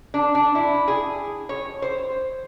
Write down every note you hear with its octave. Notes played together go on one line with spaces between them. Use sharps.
D4
D4
E4
G#4
C#5
C5